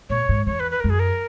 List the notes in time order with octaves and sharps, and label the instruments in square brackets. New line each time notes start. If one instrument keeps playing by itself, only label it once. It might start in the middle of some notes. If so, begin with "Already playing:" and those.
[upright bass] A#2 [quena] C#5
[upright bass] G#2
[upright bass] E2 [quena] C#5
[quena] B4
B4
[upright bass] F#2 [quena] A#4
[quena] G#4
A#4